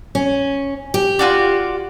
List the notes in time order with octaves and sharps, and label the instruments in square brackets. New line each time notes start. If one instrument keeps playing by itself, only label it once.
[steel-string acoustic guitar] C#4
G4
[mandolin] F4 F#4 D5